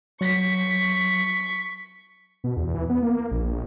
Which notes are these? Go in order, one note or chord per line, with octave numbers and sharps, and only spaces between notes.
F#3 C#6 B6
B2
E2
E3
B3
A#3
A#1